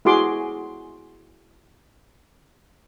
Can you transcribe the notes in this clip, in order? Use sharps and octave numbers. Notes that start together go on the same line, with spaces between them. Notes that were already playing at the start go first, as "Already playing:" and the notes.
E4 F#4 G#4 C6 D6